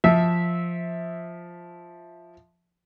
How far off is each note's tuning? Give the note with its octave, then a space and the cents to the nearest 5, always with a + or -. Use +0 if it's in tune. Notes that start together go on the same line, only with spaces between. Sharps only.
F3 +0 E5 -15